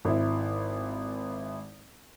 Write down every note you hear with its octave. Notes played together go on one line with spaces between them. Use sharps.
G#1 E4